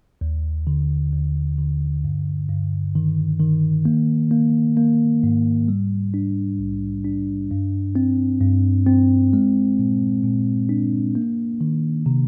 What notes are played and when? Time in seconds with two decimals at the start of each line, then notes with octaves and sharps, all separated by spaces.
0.21 D#2
0.67 D3
1.13 D#2
1.58 D3
2.04 G2
2.49 G2
2.95 D#3
3.40 D#3
3.85 A#3
4.31 A#3
4.77 A#3
5.23 G#2
5.68 G3
6.14 D4
6.59 A#1
7.05 D4
7.51 G2
7.95 C4
8.41 G2
8.87 C4
9.33 G#3
9.79 A#2
10.23 A#2
10.69 D4
11.15 A#3
11.61 D#3
12.06 C3